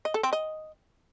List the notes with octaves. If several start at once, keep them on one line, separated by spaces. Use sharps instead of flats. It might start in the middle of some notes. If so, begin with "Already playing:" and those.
D#5
A4
C4
D#5